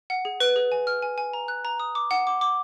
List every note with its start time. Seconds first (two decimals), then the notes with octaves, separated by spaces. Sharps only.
0.10 F#5
0.25 G#4
0.40 B4
0.56 G#4
0.72 G#5
0.87 F6
1.02 G#5
1.18 G#5
1.33 A#5
1.48 F#6
1.65 A#5
1.80 D#6
1.95 D6
2.11 F#5
2.27 D6
2.41 D6